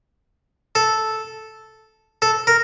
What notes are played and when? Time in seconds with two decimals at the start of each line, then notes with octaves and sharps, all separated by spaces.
0.75 A4
2.22 A4
2.47 A#4